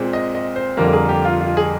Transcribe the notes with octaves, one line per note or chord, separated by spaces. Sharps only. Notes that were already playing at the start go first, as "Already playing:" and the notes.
Already playing: A#2 G#3 C4
D#5
D#5
C5
F2 D3 G3 A#3 A#4
G#4
G4
F4
F4
G#4